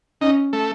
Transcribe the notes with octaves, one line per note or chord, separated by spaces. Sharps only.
C#4 D#4 D#5
A3 A4